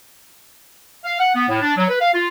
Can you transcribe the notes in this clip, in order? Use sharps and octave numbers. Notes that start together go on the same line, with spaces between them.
F5
F#5
B3
A2
D4
F#3
B4
F5
F4